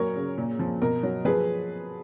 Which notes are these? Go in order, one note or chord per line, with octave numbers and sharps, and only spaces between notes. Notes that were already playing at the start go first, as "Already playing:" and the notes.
Already playing: A#2 F#3 A#4 C#5
C#3
A#2
F3
B2 A#4
F#3
F3 G#4 B4